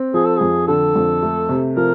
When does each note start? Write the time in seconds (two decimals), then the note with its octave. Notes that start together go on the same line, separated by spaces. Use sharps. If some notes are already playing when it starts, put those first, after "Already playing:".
Already playing: C4
0.14 F3 G#4
0.25 A4
0.37 F2 G#4
0.68 D3 A4
0.96 F2
1.23 A3
1.49 C3
1.77 F3 A#4